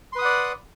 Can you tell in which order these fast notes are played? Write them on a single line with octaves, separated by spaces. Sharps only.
C6 B4 D#6 F#5 D5